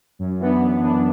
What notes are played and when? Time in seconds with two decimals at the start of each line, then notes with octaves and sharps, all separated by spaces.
0.19 F#2
0.40 E3 B3 D4
0.61 F#2
0.81 E3 B3 D4